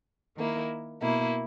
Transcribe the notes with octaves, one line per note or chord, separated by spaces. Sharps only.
D#3 A#3 E4
B2 A#3 E4